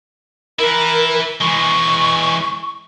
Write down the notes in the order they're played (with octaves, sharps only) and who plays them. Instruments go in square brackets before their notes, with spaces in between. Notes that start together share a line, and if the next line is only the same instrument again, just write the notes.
[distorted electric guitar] E4 B4 [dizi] A#4
[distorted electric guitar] E3 G#3 [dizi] C#6